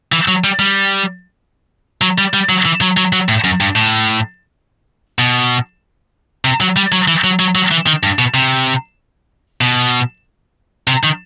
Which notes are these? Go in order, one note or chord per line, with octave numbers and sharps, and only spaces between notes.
E3
F#3
G3
G3
F#3
G3
G3
F#3
E3
F#3
F#3
F#3
A2
F#2
G2
A2
B2
C3
F#3
G3
F#3
E3
F#3
F#3
F#3
E3
D#3
G2
B2
C3
B2
C3
D#3